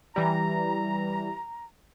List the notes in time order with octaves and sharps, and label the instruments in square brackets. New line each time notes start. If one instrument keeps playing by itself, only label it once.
[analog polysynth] E3 G3 [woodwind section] A#5